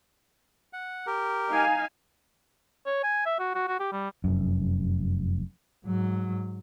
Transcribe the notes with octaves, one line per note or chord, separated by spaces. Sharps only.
F#5
G4 A#4
D#4 F5 G#5
C#5
G#5
E5
F#4
F#4
F#4
G4
G3
F1 F#2
G#2 F#3